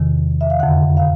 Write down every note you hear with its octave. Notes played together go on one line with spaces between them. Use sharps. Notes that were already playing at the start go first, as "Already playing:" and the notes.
Already playing: E2 C3 D#3
E5
F5
F2 D3 F#5
F5